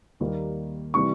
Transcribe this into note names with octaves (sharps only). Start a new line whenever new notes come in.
D#2 D#3 G3 A#3
C3 E3 G3 C#6